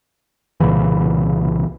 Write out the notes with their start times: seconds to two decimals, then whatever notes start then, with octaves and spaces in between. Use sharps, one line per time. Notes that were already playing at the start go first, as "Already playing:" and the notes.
0.60 C2 A#2 C#3 E3